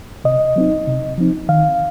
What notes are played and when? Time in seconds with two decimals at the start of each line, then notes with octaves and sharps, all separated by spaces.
0.24 C3 D#5
0.56 F#3 C4 D#4
0.87 C3
1.18 F3 C4 D#4
1.49 D#3 F5